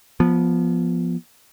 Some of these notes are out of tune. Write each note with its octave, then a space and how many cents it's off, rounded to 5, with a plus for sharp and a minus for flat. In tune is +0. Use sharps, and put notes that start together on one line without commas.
F3 +0 B3 -20